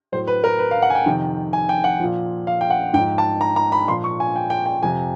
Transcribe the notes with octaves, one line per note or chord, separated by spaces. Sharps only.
A2 F#3 C5
B4
A#4
B4
F5
F#5
G#5
G5
F2 C3 D#3
G#5
G5
F#5
A#2 F3
F5
G5
F#5
G#2 F3 G5
A5
A#5
A#5
B5
A#2 F3 C6
C#6
G#5
G5
G5
G5
F2 C3 F3 G#5